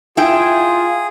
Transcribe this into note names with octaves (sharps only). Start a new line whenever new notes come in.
E4 F4 G#4 G5